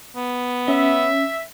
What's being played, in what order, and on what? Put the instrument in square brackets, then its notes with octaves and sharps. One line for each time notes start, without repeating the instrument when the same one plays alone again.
[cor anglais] B3
[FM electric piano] C#4 [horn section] E5